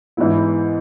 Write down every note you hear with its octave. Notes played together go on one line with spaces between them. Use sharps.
G#2 E3 B3 E4